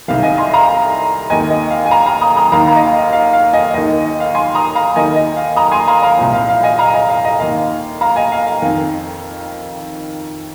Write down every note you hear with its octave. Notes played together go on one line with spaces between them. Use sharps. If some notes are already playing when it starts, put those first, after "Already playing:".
C2 C3 D#3 F5
D#5 G#5
G#5 C6
F5 A#5
D#2 D#3 D#5 G#5
D#5
F5
G#5
F5 A#5
F5 A#5
A#5 D#6
A#5 D#6
D#2 D#3 F5 A#5
F5 A#5
D#5
F5
D#5
F5
F5
D#5 G#5
D#2 D#3 D#5
D#5
F5
G#5 C6
A#5 D#6
F5 A#5
D#2 D#3 D#5 G#5
D#5
F5
A#5 D#6
G#5 C6
F5 A#5
F5 A#5
C2 A#2 F3
F5
F5
D#5 G#5
F5 A#5
D#5 G#5
F5
D#5
D#2 D#3 F5
F5 A#5
D#5 G#5
F5
F5
F2 D#3